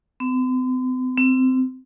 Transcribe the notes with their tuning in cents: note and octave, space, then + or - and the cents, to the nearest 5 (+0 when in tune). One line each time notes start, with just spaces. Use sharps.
C4 -45
C4 -20